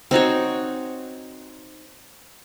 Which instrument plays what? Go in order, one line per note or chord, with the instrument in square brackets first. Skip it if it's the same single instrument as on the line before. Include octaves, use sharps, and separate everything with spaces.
[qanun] C4 D#4 F#4 C#5